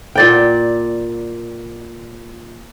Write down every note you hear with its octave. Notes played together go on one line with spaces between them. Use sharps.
A#2 D5 G5